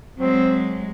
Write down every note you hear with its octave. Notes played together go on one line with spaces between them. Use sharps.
F#3 G#3 C4